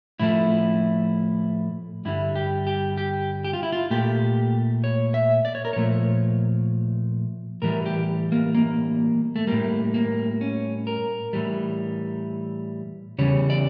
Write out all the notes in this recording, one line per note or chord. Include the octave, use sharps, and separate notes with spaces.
A2 F3 A3 E4
G2 D3 G3 E4
G4
G4
G4
G4
F4
E4
F4
A#2 A3 G4
C#5
E5
D5
C#5
A#4
A#2 F3 A3 C#5
A2 E3 G3 A#4
G4
A#3
A#3
A3
A2 G3 A#3
A#3
C#4
A#4
A2 E3 G3
E2 C#3 G3 C#5
D5